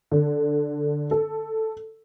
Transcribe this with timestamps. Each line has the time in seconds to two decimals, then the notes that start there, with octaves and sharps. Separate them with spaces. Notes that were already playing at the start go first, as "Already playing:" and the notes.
0.11 D3
1.11 A4